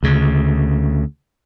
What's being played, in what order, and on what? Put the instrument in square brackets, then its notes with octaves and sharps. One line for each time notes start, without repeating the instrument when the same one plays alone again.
[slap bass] D2 C#3